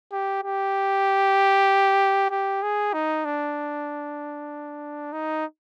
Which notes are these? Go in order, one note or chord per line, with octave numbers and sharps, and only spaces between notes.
G4
G4
G4
G#4
D#4
D4
D#4